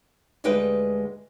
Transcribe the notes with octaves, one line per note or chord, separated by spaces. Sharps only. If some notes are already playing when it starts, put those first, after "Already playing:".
D2 G3 G#3 B4 G5